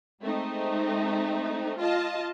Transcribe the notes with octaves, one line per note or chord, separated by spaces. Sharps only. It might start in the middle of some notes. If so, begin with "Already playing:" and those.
G#3 A3 C4 D#4
F4 D#5 A5